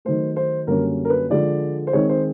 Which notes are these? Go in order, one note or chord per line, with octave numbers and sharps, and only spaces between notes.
D#3 F#3 A3 C5
C5
F#2 D3 G3 A#3 C#4 A#4
A#4
B4
D3 F3 G#3 D5
C5
D#3 G#3 C4 C#5
C5